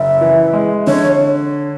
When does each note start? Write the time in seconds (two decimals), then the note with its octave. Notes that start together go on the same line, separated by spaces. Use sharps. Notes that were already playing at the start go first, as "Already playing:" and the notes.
Already playing: F#1 E5
0.21 E3
0.53 G#3
0.87 D3 C#5